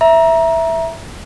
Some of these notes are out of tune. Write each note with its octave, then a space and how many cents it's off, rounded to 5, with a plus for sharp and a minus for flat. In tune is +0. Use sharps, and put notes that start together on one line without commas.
E5 +0 A#5 +20